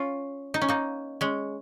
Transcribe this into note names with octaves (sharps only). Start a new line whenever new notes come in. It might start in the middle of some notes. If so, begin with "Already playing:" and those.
Already playing: C#4 F4
D#4
C#4
A#3 D#4
G#3 C#4